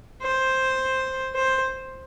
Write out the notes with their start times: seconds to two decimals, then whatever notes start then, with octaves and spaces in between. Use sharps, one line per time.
0.22 C5
1.35 C5